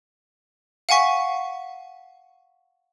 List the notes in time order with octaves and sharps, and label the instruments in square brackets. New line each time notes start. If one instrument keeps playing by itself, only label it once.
[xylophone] F5 F#5 G#5 C#6 B6